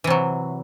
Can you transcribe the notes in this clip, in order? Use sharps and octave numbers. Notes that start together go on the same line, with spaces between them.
C3 E3 F#3